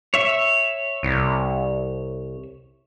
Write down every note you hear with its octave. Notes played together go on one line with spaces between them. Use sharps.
C#5 E5
C2